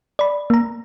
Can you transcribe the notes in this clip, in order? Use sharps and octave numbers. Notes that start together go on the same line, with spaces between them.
D5 B5
A#3 A#5